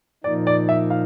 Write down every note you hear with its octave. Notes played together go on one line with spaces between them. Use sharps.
A#2 F3 A#3 D#4 D5
D5
E5
F5